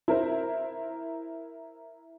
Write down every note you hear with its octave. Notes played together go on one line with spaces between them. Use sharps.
E4 A#4 C5